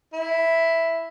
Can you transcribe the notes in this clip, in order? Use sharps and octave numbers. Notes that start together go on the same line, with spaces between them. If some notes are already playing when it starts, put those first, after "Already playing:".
E4